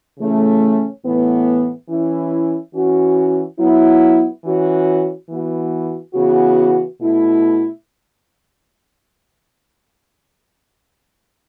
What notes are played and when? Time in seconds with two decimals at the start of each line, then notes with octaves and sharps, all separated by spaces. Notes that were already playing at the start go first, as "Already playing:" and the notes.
0.18 C#3 E3 A3 C#4
1.03 A2 E3 B3
1.89 E3 C#4 E4
2.74 E3 C#4 F#4
3.58 F#3 B3 E4
4.43 E3 C#4 F#4
5.29 E3 B3 F#4
6.14 C#3 E3 B3 F#4
6.99 B2 A3 E4